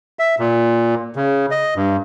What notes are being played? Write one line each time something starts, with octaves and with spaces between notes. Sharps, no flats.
E5
A#2
C#3
D#5
G2